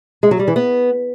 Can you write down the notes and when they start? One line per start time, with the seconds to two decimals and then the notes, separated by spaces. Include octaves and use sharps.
0.23 G#3
0.31 F#3
0.39 G3
0.48 E3
0.56 B3